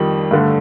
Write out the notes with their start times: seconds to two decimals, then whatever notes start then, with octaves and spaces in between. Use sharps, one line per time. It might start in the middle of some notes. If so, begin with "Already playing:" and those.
Already playing: F2 D#3 G3
0.31 G2 D3 A3